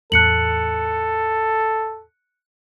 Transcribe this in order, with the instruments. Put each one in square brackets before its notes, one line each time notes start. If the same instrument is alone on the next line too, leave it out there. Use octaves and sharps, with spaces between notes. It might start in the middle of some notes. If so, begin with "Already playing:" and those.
[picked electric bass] E2 A2 A3 [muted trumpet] A4 [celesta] F#6 C#7 F#7